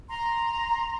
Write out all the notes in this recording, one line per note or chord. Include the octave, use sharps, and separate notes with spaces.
A#5 C6